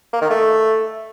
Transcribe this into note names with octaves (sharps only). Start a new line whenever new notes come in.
A#3
D#3
A3